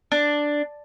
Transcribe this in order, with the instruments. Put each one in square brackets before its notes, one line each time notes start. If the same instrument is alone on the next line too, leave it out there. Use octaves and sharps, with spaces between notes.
[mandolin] D4